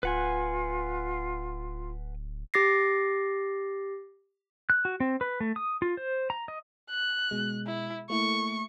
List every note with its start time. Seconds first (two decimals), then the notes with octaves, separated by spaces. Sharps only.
0.03 D1 F4 B4 F#5 G#5
2.54 G4 D6 A6 A#6 C7
4.70 F#6
4.85 F#4
5.00 C4
5.21 B4
5.40 A3
5.56 D#6
5.82 F4
5.97 C5
6.30 A#5
6.48 D#5
6.90 F#6
7.31 B2 G#3
7.66 E4
8.10 A3 A#3 E4 C#6